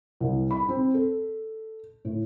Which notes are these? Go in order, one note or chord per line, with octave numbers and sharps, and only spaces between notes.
C2
B5
C4
A4
A2